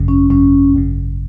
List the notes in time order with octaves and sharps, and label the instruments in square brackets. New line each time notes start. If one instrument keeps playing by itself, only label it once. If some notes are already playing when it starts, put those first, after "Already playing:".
Already playing: [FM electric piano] G#1 F#2 C#3
[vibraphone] C#4
[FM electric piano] G#1 F#2 C#3 [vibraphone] C#4
[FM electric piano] G#1 F#2 C#3